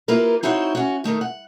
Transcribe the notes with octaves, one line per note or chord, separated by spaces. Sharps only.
A#3 E4 F4 G4 A#4 B4
C4 D#4 E4 F#4 C5 C#5
C#4 F#4
D#3 A3 D#4 A#4
F#5